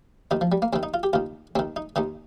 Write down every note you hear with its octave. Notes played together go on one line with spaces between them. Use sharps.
D#2 D#3 D#4
F3
G3
A#3
D#2 D#3 C4
D#4
F4
G4
D#2 D#3 F4
D#2 D#3 C4
D#4
D#2 D#3 D#4